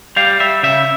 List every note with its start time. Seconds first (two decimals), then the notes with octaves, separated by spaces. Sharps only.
0.16 G3 F5
0.40 G3 E5
0.63 C#3 E5